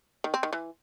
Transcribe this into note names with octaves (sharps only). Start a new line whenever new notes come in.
D#3
C4
D#3
E3